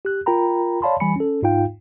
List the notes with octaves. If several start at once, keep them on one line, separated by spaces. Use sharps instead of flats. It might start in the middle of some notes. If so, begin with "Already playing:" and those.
G4 F#6
F4 A#4 G5 A#5 B5
C#5 D5 F5 A5 B5 C6
E3 G3 G#5 B5 C#7
C#4 A4
G#2 D#4 F4 F5 G5